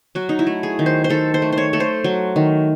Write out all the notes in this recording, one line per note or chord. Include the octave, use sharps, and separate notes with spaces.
F#3 F#4
D#4
E4
A3
G#4
D#3
C5
C5
D#3 A4
C5
A3
C5
C#5
A3 A4
C5
F#3
D#3